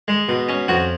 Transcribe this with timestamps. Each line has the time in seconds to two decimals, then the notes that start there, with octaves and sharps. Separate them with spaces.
0.08 G#3
0.28 B2
0.48 C#4
0.68 F2 F#4